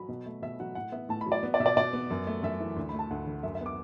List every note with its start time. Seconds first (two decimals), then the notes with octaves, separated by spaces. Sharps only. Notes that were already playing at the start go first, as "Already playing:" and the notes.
Already playing: F#3 B5
0.08 B2
0.26 A3
0.42 B2 E5
0.60 F#3 F#5
0.75 A2 F#5
0.92 B3 E5
1.09 A2 A5
1.21 B5
1.26 F#3
1.32 D5
1.43 B3
1.54 D5
1.60 B2 E5
1.66 D5
1.77 B2 D5
1.93 B3
2.10 F#2
2.27 A3
2.43 F#2 E5
2.60 E3
2.76 D2
2.89 A3 B5
2.99 A5
3.11 D2 F#5
3.27 D3
3.43 F#2 E5
3.55 E5
3.61 B3 D6